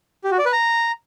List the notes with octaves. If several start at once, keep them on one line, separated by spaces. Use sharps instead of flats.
G4
F#4
D5
B4
A#5